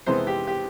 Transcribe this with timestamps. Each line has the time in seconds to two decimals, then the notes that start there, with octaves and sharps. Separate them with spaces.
0.06 F2 C3 E3 G#3 B3 C5
0.27 G4
0.47 G4